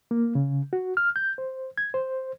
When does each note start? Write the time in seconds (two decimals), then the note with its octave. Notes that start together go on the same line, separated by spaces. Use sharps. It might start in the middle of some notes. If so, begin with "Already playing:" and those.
0.11 A#3
0.35 C#3
0.73 F#4
0.97 F6
1.16 G6
1.38 C5
1.78 G#6
1.94 C5